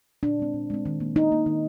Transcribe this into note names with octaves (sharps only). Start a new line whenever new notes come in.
A#2 D4
G#3 C4
A#2
G#3 C4
D#3
A#3
D#3 D#4
A#3
D#3